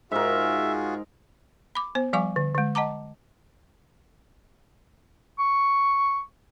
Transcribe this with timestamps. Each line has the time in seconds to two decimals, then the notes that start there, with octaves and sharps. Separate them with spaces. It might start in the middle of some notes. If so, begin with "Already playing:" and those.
0.12 G#2 F4 F#4 G#4 A#4 E5
1.75 B5 D6
1.95 B3 C5
2.13 F3 G3 F5 G#5 C#6 D6
2.36 D3
2.55 D3 G#3
2.75 D#5 F#5 A5 A#5 D6
5.39 C#6